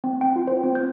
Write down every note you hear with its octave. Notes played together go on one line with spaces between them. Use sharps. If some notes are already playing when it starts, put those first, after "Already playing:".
C4
G5
F4
C5
C4
G6